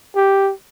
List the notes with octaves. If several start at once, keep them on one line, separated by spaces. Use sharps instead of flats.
G4